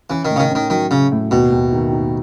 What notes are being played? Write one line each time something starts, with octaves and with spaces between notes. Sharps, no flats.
E3 C#4
A2 D#3
C#3
D#3
C#4
D#3
D#3 F#3
C#3 C#4
A2
D#2 B2
D#2
D#3
D#4